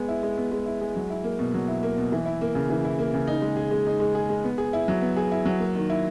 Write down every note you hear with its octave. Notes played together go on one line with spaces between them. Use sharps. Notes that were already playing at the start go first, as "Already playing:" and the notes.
Already playing: G#3 B3
E4
G#3
B3
G#3
E4
G#3
F#3
E4
A#3
B2
F#3
E4
A#3
B2
E3
E4
A#3
C#3
E3
E4
A#3
C#3
D#4
G#3
G#4
G#3
D#4
G#3
G#4
G#3
B3
G#4
E4
F#3
B3
G#4
E4
F#3
A#3
D#3
E4